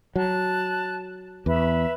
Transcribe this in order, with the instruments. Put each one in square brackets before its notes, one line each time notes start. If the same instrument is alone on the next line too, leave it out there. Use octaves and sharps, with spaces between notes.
[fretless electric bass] F#3 [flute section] A5 F#6
[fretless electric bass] E2 [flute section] B4 E5